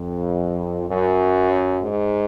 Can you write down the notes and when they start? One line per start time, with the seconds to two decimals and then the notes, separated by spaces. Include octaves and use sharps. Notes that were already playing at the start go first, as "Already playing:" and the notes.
Already playing: F2
0.88 F#2
1.82 G#2